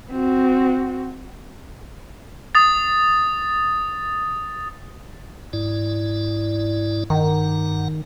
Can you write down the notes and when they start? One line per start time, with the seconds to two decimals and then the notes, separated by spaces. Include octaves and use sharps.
0.11 C4 F#4
2.55 D#6 A6
5.53 G#2 E4 D5
7.10 G2 D#3 F#5 A#5